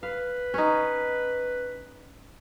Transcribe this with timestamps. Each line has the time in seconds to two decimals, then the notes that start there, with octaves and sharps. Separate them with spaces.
0.03 B4 F5
0.54 C#4 D#4